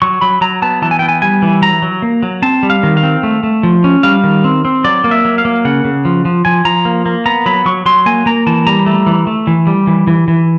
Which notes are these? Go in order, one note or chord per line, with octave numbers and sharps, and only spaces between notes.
F#3 C#6
F#3 B5
F#3 A#5
B3 A5
E3 A5
G#5
B3 G5
G#5
G3 G#5
E3
F#3 A#5
F#3
A#3
F#3
C4 A5
G3
F5
D#3
F5
C4
A3
A3
F3
C#4
G3 F5
D#3
C4
C4
F#3 D5
A#3
E5
F#3
F5
A#3
C#3 F#5
C#3
F3
F3
F3 G#5
F3 A#5
A#3
A#3
B3 A#5
F#3 B5
F#3 C#6
F#3 C6
A#3 G#5
A#3 A#5
E3 A5
G3 A#5
A3
E3
A3
E3
G3
E3
E3
E3